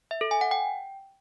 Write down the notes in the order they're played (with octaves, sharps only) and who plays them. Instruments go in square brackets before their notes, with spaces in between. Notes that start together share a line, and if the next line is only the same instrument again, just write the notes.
[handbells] E5
A4
G#5
F#5
G5